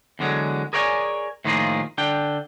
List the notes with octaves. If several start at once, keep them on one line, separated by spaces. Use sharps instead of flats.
E2 D3 F#3 G#3
G#4 A#4 C#5 D5 F#5 G#5
A2 D#3 F3 A#3 F4 G#4
D3 D4 G5